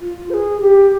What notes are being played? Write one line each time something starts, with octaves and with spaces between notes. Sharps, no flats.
F4
C5
G#4
G4